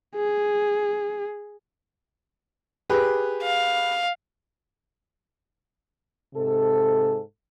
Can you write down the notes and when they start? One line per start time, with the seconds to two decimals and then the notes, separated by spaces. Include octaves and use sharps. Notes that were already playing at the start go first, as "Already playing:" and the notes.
0.16 G#4
2.90 G4 G#4 B4
3.42 F5
6.35 G#2 C3 A4